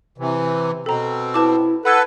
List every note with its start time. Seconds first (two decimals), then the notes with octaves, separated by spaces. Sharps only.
0.18 C3 E3
0.86 B2 C4 A4 A#5
1.34 E4 B4 A5 D6
1.85 A4 B4 F#5 B5 E6 G#6